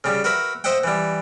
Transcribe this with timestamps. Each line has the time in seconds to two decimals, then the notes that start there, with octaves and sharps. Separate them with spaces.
0.04 C#3 G3
0.24 F#4 A#4 B4 E5
0.64 C5 D#5 E5 F#5 G5
0.84 E3 G3